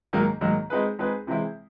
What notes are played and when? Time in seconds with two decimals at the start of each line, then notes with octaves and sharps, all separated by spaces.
0.13 G#2 D#3 F#3 A#3
0.41 G#2 D#3 F#3 A#3
0.70 G#3 C4 D#4 G#4 B4
0.99 G#3 C4 D#4 G#4 B4
1.27 C3 E3 G#3 C4 E4